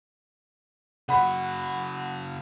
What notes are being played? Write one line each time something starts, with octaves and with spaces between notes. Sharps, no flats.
C#3 F#4 F#5 B5